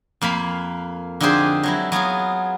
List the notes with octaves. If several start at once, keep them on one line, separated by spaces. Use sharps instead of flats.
F2 A#3 F5 B5
D3 F3 D#4 G4 G#4 C5
F#3 G#3 E4
F#3 B3 F4 G#4